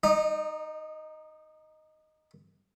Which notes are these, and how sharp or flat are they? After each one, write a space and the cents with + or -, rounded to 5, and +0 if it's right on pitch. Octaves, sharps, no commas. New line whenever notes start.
D#4 +0 D#5 -40